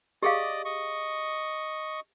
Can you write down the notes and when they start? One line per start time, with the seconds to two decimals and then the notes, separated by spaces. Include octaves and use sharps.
0.22 G4 G#4 D5 D#5 F5
0.65 D#5 C#6